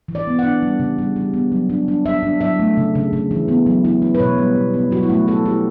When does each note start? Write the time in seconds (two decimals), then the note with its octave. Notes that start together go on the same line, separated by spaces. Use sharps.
0.08 E3
0.15 D5
0.27 B3
0.39 D4 F#5
0.63 G3
0.80 C#3
0.98 G3
1.16 G3
1.34 B3
1.52 F#3
1.70 D4
1.88 D4
2.05 D4 E5
2.23 D4
2.41 F#3 E5
2.59 A3
2.77 C#3
2.95 C#3
3.13 C#3
3.31 E3
3.48 B3
3.66 F#3
3.85 E4
4.02 E4
4.15 B4
4.20 B2 C#5
4.38 G3
4.56 B2
4.74 B3
4.91 F#3 F#4
5.03 E4
5.09 A3 F#4
5.27 E4 A4
5.45 E4 G4